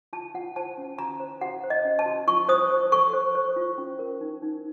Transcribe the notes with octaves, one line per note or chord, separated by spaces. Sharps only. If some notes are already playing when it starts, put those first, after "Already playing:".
F4 A5
F4 F#5
C5 A5
C#4
F#4 A#5
C5
F#4 F#5
C5
D#5
C#4
A5
F#4
F4 C#6
C5 D#6
C5
A4 C#6
C5
C5
F4
C#4
A#4
D#4
D#4